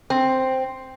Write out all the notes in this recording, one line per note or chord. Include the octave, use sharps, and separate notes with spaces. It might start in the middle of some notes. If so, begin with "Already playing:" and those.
C4